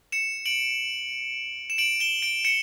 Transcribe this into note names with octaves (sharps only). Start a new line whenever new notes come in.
C#7 E7
D7 F#7
E7
D7 F#7
E7 G7
D7 F#7
C#7 E7